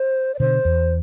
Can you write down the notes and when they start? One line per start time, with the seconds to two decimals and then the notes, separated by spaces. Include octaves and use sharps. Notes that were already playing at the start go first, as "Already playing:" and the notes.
Already playing: C5
0.35 D5
0.39 B2 D3 C5
0.65 E2